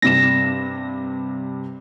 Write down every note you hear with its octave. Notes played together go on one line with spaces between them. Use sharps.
G2 C3 A#6 E7